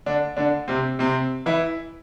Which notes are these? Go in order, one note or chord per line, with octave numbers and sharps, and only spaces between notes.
D3 D4
D3 D4
C3 C4
C3 C4
E3 E4